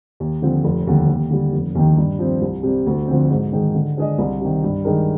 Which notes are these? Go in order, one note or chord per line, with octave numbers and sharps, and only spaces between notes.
D#2
D3 F3 C4
F1
D#2 D3 G3
D#2
D3 G3
F1
D#2 D#3
G2
F3 C4
C2
C3 G3
D2
D3 F3 C4
G#2
D#3 G#3
D3
G#3 D4 G#4 D#5
C2
C3 D#3
G2
D#3 G#3 D#4 A#4